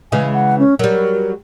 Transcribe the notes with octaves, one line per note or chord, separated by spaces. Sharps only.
C#3 E3 G#3 G#5
F#5
C#4
F#3 G3 A#4